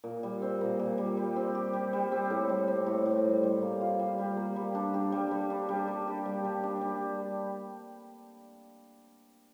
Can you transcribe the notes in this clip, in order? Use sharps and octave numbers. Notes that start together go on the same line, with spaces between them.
A#2
G3
C4
A#2
A#2
G3
G3
C4
G4
G3
G3
C4
A2
G3
C4
A2
A2
G3
G3
A#3
F4
G3
G3
A#3
G3
D4
G4
G3
G3
D4
G3
D4
G4
G3
G3
D4
G3